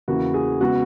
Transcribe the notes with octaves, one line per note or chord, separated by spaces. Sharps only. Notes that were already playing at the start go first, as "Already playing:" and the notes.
E2 C#3 E3 A#3 F#4
G#4
C#3 G#3 B3 F#4